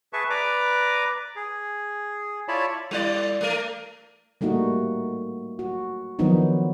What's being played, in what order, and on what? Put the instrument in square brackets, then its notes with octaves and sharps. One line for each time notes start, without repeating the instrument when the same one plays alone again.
[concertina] G#4 B4 E5 A5 C#6
B4 D5 A#5 D6
G#4
E4 F4 C#5 D5 A5 B5
[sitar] G3 E4 D5
A3 A#4
[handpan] G3 A3 A#3 D#4 F#4
F#4
D#3 F3 F#3 B3 D4 D#4